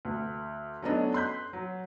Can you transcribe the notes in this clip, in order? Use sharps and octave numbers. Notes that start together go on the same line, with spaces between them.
D2
F#3 A3 B3 C#4 D4 D#5
C6 F#6 G6 B6
F#3